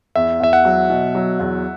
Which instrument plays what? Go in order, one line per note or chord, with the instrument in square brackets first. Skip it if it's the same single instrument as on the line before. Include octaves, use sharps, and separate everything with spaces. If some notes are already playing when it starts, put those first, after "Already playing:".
[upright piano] E2 [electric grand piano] E5
[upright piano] E2 [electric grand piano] E5
[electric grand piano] F#5
[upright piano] F#3
B2
F#3
E2